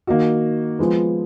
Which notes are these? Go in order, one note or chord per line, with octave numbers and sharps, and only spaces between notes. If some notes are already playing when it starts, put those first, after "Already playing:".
D#3 A#3 D#4 F#4
F3 G#3 B3